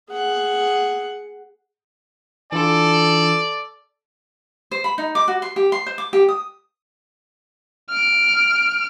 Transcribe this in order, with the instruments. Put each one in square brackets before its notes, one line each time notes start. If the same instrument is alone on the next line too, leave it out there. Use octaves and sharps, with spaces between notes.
[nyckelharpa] G#4 F#5
[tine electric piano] E3 D4 F4 [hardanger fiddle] A4 [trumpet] D5
[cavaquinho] C5
B5
D#4
D6
F#4
C6
G4
C6
C5
D6
G4
D#6
[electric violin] F6 D7